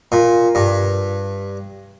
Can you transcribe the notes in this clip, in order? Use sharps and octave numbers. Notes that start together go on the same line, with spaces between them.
A#2
G2